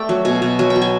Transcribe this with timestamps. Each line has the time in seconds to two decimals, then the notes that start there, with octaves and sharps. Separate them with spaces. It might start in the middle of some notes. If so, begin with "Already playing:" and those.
Already playing: A3 D5 G5
0.09 F#3
0.25 B2 G#5
0.42 B2 G#5
0.59 F#3 G#5
0.70 G5
0.76 F#3
0.82 G#5